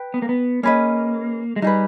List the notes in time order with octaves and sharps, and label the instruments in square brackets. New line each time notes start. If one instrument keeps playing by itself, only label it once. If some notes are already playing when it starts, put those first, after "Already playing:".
Already playing: [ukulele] B4 G5
[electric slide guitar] B3
A#3
B3
[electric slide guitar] A#3 [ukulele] C#4 G#4 B4 D#5
[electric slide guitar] G#3
[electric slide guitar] G3 [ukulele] D#4 G#4 B4